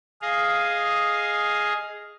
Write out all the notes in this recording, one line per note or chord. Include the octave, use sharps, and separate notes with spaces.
G#4 D#5 F5